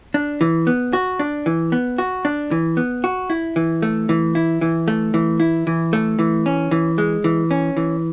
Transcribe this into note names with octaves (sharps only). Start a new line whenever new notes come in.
D4
E3
B3
F#4
D4
E3
B3
F#4
D4
E3
B3
F#4
E4
E3
A3
E3
E4
E3
A3
E3
E4
E3
A3
E3
C#4
E3
G#3
E3
C#4
E3